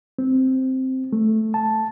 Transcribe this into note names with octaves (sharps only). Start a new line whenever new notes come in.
C4
A3
A5